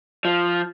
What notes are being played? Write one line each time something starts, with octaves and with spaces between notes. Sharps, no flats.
F3